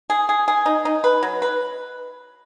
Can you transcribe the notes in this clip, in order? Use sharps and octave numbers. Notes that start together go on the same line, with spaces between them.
G#4
G#4
G#4
D#4
D#4
B4
F#3
B4